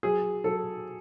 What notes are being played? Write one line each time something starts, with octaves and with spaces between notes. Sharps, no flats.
F#3 G#4
F#3 A4